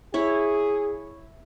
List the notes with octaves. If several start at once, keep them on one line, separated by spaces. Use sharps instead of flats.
E4 G#4 C#5